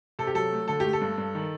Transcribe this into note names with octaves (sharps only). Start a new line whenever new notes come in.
C3 A4
G4
F#3 A4
A3
D3 A4
A3 G4
A4
G2
G2
D#3